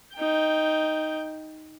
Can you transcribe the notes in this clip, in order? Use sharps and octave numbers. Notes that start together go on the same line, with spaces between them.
D#4 G5